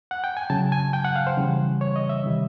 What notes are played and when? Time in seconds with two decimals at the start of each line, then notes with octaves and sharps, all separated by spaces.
0.11 F#5
0.24 G5
0.37 G#5
0.50 C#3 F#3 A5
0.72 G#5
0.93 G5
1.05 F#5
1.16 F5
1.27 C5
1.37 C#3 E3 G3
1.81 C#5
1.96 D#5
2.09 E5
2.24 C3 D#3 G3